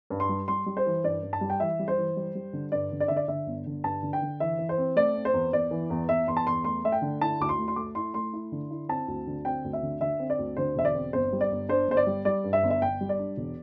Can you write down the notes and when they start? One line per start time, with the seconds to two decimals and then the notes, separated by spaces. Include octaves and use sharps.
0.10 G2
0.20 C6
0.29 G3
0.48 G3 C6
0.66 G3
0.77 C5
0.86 E3
1.04 G2 D5
1.23 G2
1.33 A5
1.41 G3
1.50 G5
1.60 E3 E5
1.79 G3
1.88 C5
1.98 E3
2.16 G3
2.35 G3
2.53 D3
2.72 G2 D5
2.92 D3
3.00 D5
3.08 D3 E5
3.16 D5
3.28 D3 E5
3.47 G1
3.66 D3
3.84 G2 A5
4.03 D3
4.13 G5
4.22 D3
4.40 E3 E5
4.59 E3
4.69 C5
4.78 C4
4.96 A3 D5
5.15 C4
5.25 C5
5.33 E2
5.52 E2 D5
5.71 E3
5.90 E2
6.09 E2 E5
6.27 E2 C6
6.37 A5
6.47 E2 C6
6.64 A3 C6
6.84 A3 E5
6.92 G5
7.02 D3
7.21 E4 A5
7.40 D2 D6
7.49 C6
7.59 A3
7.68 C6
7.76 A3 D6
7.95 E4 C6
8.14 A3 C6
8.33 E4
8.52 D3
8.71 E4
8.89 C4 A5
9.08 D2
9.27 D3
9.45 C4 G5
9.64 D2
9.73 E5
9.83 D3
10.01 D3 E5
10.20 C4
10.30 D5
10.39 D2
10.57 D3 C5
10.76 E1 E5
10.85 D5
10.95 C4
11.13 G1 C5
11.33 G3
11.41 D5
11.51 G1
11.69 D4 C5
11.88 G1 C5
11.97 D5
12.07 G3
12.25 G3 D5
12.44 G2
12.53 E5
12.63 G1
12.70 E5
12.82 G1 G5
13.01 G3
13.09 D5
13.19 D4
13.37 E1